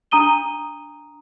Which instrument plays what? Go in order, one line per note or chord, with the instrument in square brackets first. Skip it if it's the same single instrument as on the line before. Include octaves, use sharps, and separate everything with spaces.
[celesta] D4 A#5 D#6 D#7 G7